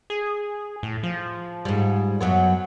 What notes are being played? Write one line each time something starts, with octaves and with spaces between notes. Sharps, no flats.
G#4
A2
F3
G#2 G3
F#2 F#3 B3